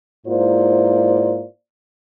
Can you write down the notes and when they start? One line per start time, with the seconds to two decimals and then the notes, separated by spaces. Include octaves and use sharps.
0.27 G#2 A#3 E4 F4 C5 D5